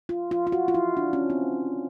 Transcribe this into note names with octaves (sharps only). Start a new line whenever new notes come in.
F4
F4
F4
F#4
F4
E4
D4
C#4
C4